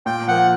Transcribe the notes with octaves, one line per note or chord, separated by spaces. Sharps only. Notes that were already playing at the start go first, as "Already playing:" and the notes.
A#2 G5
F3 A#3 F#5